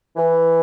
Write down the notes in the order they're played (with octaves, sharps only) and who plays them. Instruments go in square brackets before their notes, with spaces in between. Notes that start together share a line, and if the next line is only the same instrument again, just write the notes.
[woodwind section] E3